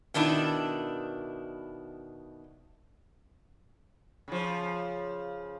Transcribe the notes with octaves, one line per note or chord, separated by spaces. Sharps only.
B2 D#3 D4 E4
C#3 F3